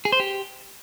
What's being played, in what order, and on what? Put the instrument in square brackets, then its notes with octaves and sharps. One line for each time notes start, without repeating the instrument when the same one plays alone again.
[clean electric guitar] G#4
C5
G4